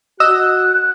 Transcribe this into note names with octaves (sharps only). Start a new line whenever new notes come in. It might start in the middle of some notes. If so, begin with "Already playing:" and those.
F#4 D#5 E6 F#6